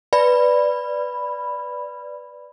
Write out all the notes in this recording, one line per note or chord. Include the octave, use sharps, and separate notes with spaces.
B4 D5 B5